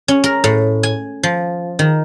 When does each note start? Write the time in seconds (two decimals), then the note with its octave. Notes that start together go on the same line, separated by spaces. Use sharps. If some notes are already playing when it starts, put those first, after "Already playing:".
0.08 C#4
0.24 A#4
0.44 A2
0.83 G#5
1.23 F3
1.79 D#3